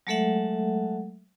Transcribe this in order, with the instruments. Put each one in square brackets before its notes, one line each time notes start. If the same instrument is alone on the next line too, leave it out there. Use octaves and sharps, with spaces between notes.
[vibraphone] F#3 G#3 A3 A4 E5 F#5